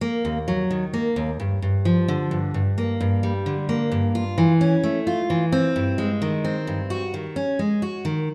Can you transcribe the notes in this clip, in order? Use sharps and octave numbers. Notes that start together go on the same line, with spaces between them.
A#3
D#2
F#3
D#3
A#3
D#2
G2
G2
F3
D3
G2
G2
A#3
G2
G3
D3
A#3
G2
F4
E3
C#4
A3
F4
E3
C4
G2
G#3
D#3
C4
G2
F#4
D#3
C#4
G#3
F#4
D#3